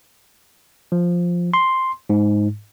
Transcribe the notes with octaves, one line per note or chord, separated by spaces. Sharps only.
F3
C6
G#2